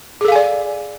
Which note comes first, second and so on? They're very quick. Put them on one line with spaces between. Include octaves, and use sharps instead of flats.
G#4 A4 F5 G#5 D5